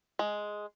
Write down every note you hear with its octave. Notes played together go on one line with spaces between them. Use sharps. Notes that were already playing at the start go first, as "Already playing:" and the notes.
G#3